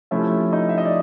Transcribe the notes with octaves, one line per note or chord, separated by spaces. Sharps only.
C3 F3 A3 C#4 E4 E5
D#4 D#5
E5
D#5
D5